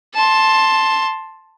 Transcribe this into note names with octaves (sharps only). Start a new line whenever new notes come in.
A5 C6